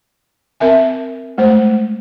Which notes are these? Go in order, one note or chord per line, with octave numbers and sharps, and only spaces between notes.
C4 A#4 E5 G#5
G#3 A3 C5